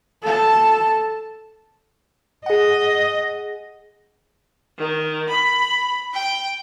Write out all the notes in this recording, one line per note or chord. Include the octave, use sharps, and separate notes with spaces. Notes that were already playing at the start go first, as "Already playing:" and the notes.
A4 A5
G#4 D#5 F#5
D#3
B5
G5